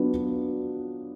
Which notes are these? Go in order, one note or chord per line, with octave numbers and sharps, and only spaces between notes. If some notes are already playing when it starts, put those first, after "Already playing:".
Already playing: F#3 B3 D4 F4